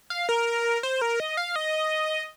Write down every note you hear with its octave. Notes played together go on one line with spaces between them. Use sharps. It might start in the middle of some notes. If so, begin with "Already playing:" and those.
F5
A#4
C5
A#4
D#5
F5
D#5